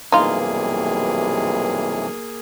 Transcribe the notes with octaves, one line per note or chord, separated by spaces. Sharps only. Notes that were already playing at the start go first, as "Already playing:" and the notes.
B1 G2 C3 E3 A#3 D#4 F4 G#4